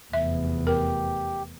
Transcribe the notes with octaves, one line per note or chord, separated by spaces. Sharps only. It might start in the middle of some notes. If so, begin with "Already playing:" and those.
F1 E2 E5
G4 A#4